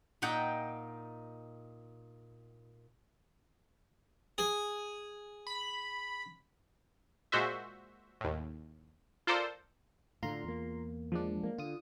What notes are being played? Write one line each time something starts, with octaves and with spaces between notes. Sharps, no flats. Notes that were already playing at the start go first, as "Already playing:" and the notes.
A#2 D#4 F#5 G5
G#4 G#5
B5
A#2 G#3 F#4 C5 E5
D#2 A2
F4 A4 A#4 C5 D5
A2 D3 F4 A#5 C6
E2 A#3
F3 G#3 D4
A#3
D3 F4 D#6